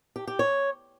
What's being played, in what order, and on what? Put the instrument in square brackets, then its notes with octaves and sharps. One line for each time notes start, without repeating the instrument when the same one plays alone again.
[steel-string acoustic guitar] G4
G4
C#5